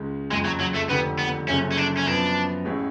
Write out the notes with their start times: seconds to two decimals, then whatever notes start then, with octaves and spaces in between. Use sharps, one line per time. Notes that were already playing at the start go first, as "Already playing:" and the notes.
Already playing: C#2 C#3 G#3
0.31 F#1 F2 C#3 G#3
0.45 F#3
0.61 F#3
0.75 A3
0.89 F1 F2 D3 B3
1.19 B3
1.48 F#1 F#2 C#3 F3 A3 C#4
1.72 C#4
1.77 D4
1.97 C#4
2.06 F#2 F3 B3 D4
2.64 A1 A2 G#3 C#4